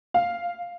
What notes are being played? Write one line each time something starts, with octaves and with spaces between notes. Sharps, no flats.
F5